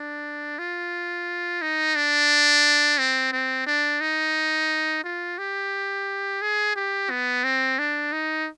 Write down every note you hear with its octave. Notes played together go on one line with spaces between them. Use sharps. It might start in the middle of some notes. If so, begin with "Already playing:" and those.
Already playing: D4
F4
D#4
D4
C4
C4
D4
D#4
F4
G4
G#4
G4
B3
C4
D4
D#4